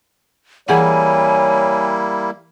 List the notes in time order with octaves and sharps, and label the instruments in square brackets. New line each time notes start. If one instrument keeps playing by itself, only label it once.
[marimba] E3 G#4 F#5 [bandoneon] G3 A#3 E4 [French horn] C#5 [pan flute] G#5